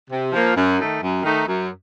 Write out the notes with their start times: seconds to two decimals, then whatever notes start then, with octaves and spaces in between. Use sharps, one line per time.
0.10 C3
0.32 F3 A#3
0.55 F#2
0.78 D#3 A3 D#4
1.01 F#2
1.23 D#3 A3 D#4
1.46 F#2